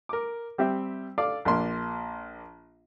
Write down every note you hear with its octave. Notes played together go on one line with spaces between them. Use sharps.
A#4 D6
G3 C4 G4 E5
A4 D5 F5 D6
A#1 A#3 D5 C6